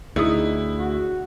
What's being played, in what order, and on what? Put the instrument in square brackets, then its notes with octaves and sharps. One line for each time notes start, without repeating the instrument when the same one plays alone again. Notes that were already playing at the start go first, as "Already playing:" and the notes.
[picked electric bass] D2 [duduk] D#4 [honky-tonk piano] E4 [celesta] G#4 D#6
[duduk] F#4